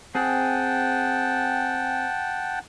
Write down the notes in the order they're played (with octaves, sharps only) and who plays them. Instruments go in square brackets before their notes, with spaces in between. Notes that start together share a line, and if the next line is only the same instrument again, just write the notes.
[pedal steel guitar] C4 G#4 [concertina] F#5 G5 A5